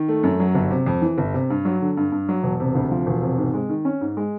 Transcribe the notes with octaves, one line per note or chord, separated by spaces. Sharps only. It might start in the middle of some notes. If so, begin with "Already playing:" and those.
Already playing: D#3
A3
F#2
F#3
G1
C3
F2
E3
G1
C3
G2
F#3
D3
G2
G2
F#3
E1
C3
D2
F3
E1
C3
G#2
G#3
D#3
C#4
G#2
G#3